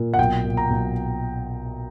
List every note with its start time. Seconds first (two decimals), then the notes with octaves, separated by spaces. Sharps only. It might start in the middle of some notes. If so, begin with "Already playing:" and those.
Already playing: A#2
0.14 F#5
0.18 B1 G5
0.45 A#2
0.57 A#5
0.70 B1